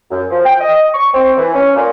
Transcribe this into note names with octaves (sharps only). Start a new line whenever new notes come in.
F#2
F3
G5
D#5
C#6
C4
E3
C#4
A#2